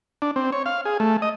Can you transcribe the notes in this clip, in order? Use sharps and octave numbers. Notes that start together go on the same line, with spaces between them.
D4
C4
C#5
F5
G#4
A3
D#5